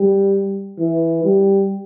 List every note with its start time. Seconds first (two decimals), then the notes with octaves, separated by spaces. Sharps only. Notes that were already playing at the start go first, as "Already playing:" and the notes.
Already playing: G3
0.79 E3
1.25 G3